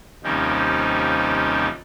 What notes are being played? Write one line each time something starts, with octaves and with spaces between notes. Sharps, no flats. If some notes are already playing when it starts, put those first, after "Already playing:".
D#2 C3 F3 G3 C#4 D#4